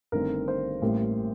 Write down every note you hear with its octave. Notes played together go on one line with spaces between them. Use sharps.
G1 G2 D#3 A3 C4 A#4
C5
A1 A2 G3 A#3